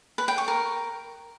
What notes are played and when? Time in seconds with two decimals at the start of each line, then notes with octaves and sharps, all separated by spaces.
0.18 B4
0.28 G5
0.38 C#6
0.48 A#4